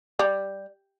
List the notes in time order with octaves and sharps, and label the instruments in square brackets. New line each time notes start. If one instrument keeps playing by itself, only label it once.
[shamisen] G3